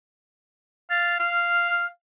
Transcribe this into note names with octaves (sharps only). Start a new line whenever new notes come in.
F5 A6
F5 F6